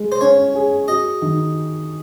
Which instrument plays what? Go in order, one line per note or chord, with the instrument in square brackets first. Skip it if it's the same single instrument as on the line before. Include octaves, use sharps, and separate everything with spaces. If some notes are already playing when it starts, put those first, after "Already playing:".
Already playing: [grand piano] G#3
[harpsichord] C5
[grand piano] C#4 [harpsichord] C#5
[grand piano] G#4
[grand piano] F#4 [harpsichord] D#5
[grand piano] D#3